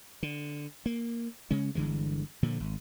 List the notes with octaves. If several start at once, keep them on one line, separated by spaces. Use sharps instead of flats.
D3
A#3
C#3 G#3 C#4
G1 D3 E3 G#3
A#2 D3 F3
G#1